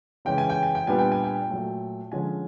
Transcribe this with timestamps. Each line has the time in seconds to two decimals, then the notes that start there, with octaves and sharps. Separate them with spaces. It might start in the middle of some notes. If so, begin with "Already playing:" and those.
0.25 C#3 E3 G#3 C#4 G5
0.38 G#5
0.49 G5
0.63 G#5
0.75 G5
0.87 A#2 G3 B3 D4 F4 G#5
0.98 G5
1.12 G#5
1.24 G5
1.50 A#2 F#3 A3
2.12 D3 F3 G#3 C#4 G#5